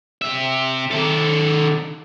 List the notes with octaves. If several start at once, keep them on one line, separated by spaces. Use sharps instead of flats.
C3 E5
D#3 A4